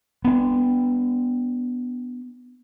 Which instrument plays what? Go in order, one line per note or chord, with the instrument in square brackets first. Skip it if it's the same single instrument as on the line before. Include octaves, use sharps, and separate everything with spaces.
[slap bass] B3 D4